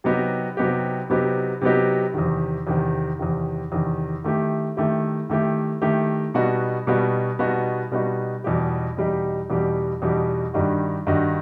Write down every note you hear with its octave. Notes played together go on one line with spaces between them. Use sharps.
C3 F#3 B3 D#4 G4
C3 F#3 B3 D#4 G4
C3 F#3 B3 D#4 G4
C3 F#3 B3 D#4 G4
E2 C3 D#3
E2 C3 D#3
E2 C3 D#3
E2 C3 D#3
D#3 A3 E4 G4
D#3 A3 E4 G4
D#3 A3 E4 G4
D#3 A3 E4 G4
B2 G3 B3 D#4 F#4
B2 G3 B3 D#4 F#4
B2 G3 B3 D#4 F#4
B2 G3 B3 D#4 F#4
E2 B2 G3 D#4 G4
E2 B2 G3 D#4 G4
E2 B2 G3 D#4 G4
E2 B2 G3 D#4 G4
G2 D#3 G3 D#4 F#4
G2 D#3 G3 D#4 F#4